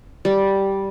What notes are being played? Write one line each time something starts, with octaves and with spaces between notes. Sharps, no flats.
G3